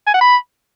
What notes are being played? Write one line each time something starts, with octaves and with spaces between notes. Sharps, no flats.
G#5
F#5
B5